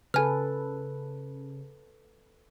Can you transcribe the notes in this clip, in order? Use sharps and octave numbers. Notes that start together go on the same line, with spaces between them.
C#3 A4 B4 G#5 F6